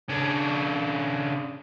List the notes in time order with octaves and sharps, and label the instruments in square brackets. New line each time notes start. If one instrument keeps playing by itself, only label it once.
[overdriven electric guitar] C#3 D4